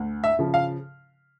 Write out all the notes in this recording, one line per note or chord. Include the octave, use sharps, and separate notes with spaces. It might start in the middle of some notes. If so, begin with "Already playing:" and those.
Already playing: D2
E5
C#3 F3
F5